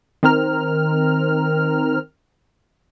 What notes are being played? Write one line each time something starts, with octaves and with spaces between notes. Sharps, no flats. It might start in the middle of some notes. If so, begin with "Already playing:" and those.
D#3 C4 A#4 F6